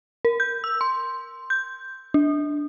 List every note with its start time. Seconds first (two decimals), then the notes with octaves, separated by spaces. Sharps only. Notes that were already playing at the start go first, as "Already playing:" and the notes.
0.25 A#4
0.40 G6
0.64 E6
0.81 C6
1.50 G6
2.14 D4